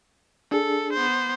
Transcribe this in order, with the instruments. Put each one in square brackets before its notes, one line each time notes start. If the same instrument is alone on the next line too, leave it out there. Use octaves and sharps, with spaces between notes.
[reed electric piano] D4 G#4 [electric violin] A4
[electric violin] B3 C5